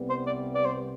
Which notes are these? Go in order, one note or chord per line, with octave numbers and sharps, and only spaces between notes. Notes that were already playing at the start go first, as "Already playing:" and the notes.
Already playing: C2 C3 G3 B3
C5
D5
D5
C5